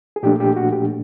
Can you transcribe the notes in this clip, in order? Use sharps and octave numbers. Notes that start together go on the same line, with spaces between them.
G#4
A#2 F3 A3 D4 G4
G4
F#4
G4